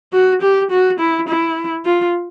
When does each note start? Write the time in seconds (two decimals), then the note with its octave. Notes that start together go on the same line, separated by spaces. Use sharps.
0.13 F#4
0.42 G4
0.71 F#4
1.00 E4
1.28 E4
1.85 F4